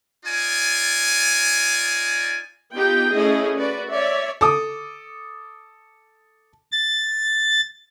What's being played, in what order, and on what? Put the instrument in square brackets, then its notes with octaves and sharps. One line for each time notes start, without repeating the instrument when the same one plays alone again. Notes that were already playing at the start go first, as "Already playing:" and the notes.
[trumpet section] D#4 F4 D5 G#5
[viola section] B3 D#4 F4 G4 G5
A3 C#4 E4 G#4 A4 D#5
F#4 B4 D5
C#5 D5 E5
[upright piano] A4 D6 D#6
[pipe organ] A6